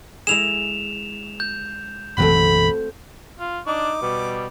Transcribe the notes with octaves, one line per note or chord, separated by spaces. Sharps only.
G#3 E4 G#4 E7 F7
G6
F#1 B1 E3 A3 C4 F#4 B5
F4
D4 D#4 D6
B2 G3